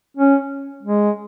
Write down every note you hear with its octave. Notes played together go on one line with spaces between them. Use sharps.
C#4
G#3